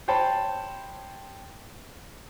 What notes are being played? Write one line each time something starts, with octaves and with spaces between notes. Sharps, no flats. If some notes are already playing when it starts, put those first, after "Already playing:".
C5 C#5 G5 A5 B5